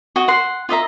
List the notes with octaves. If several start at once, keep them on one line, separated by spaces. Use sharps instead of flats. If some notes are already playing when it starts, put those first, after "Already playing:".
F#4 D#5
F#5 C6
F4 D#5 E5 A#5